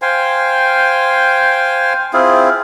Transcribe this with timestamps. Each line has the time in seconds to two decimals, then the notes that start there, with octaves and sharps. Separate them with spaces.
0.02 C5 F5 G5 G#5
2.13 C4 E4 F4 G#4